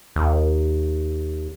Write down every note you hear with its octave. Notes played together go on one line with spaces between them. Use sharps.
D#2